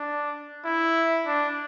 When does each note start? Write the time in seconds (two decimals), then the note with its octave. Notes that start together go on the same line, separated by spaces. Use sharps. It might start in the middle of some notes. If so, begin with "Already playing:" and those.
Already playing: D4
0.65 E4
1.26 D4